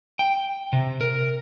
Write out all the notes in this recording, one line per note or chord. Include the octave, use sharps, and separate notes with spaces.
G5
C3
A#4